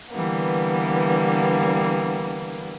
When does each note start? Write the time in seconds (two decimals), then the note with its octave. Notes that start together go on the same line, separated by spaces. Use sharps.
0.12 D3 E3 G3 A#3 B3